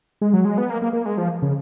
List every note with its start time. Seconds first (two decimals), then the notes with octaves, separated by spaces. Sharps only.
0.21 G#3
0.33 F#3
0.45 G#3
0.58 B3
0.70 A#3
0.82 A#3
0.93 A#3
1.06 G#3
1.18 F3
1.42 C#3